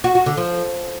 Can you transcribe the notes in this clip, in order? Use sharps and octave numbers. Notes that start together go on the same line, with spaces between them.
F#4
F#4
D3
F3